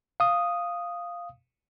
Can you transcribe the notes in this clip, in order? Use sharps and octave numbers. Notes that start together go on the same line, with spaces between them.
F5 D#6